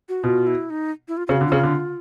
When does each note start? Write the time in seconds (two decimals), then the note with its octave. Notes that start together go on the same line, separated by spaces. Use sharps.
0.09 F#4
0.24 B2 F4
0.47 E4
0.70 D#4
1.08 E4
1.17 F4
1.27 C#3 F4
1.32 F#4
1.41 D3
1.47 C#3 F4
1.63 D3